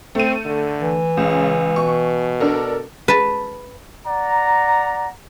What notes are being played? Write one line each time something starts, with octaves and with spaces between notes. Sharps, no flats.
A3 C4 D#7
D3
E3
C#2 C#3
B2 C#6
D4 A4 A#4
B4 A5
D5 F#5 A#5